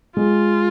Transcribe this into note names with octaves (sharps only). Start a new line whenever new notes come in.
G#3 F4